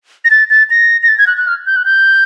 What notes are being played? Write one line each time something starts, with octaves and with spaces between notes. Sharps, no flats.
A#6
A6
A6
A#6
A#6
A6
G#6
F#6
F#6
F6
G6
F#6
G6